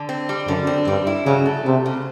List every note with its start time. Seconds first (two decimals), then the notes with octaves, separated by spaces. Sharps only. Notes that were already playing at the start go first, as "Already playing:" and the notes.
Already playing: D3
0.09 C4
0.29 G3
0.47 F#2 D3
0.67 C4
0.87 G2 G3
1.07 E4
1.26 C#3 F#3
1.46 A3
1.65 C3 F#3
1.86 C#3